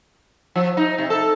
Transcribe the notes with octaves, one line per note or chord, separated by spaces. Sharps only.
F3
D#4
C3
A4